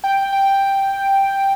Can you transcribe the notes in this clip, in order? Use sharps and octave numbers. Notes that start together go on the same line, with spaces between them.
G5
G5